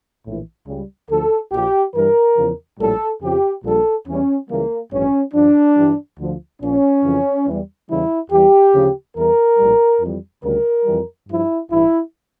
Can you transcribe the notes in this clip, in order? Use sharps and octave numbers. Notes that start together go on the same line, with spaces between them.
A#1 A2 E3
C#2 C#3 G3
D2 D3 F3 A4
A#1 A#2 F3 G4
G2 E3 G3 A#4
E2 C#3 F3
A#1 A2 G3 A4
F2 C#3 F3 G4
A#1 A#2 G3 A4
E2 E3 G3 C#4
C#2 C#3 E3 G3 A#3
A1 G2 F3 C#4
G2 F3 D4
G2 E3 G3
D2 D3 F3
A#1 A#2 F3 C#4
F2 C#3 E3
E2 E3 G3
E2 C#3 E3 G3 E4
E2 E3 G3 G4
D2 C#3 F3
E2 E3 G3 A#4
A#1 A2 G3
F2 E3 G3
D2 C#3 G3 A#4
F2 E3 G3
G2 F3 E4
A1 G2 E3 E4